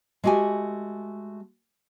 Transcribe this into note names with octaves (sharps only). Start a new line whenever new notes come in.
G#3 A3 F#4 G4 G#5